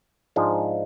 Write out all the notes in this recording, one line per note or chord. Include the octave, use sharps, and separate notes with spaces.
G#2 F3 G#3 D4